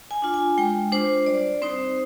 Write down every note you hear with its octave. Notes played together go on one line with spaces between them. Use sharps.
G#5
D4 F4
G#5
G#3 G5
D4 F4 C5
G3 D5
C4 D#4 C5